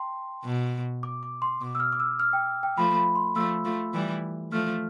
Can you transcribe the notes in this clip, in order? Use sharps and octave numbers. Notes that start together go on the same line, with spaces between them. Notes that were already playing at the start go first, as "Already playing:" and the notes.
Already playing: G5 A5 C6
B2
D6
D6
C6
B2 D6
E6
F6
D6
E6
F6
G5
G5
F3 A3 B5
B5
C6
F3 A3 E6
F3 A3
E3 G3
F3 A3 F6